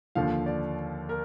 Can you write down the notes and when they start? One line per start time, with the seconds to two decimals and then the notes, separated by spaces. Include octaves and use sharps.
0.15 D#2 D3 F3 F5
0.46 D5
1.09 A#4